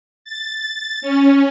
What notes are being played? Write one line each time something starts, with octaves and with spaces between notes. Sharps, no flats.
A6
C#4